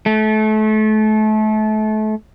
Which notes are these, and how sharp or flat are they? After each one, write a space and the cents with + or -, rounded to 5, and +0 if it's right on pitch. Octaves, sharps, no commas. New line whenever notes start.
A3 -30